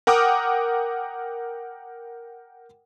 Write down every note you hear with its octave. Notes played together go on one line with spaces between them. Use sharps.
A#4 F#5 G5 D6 D#6 F6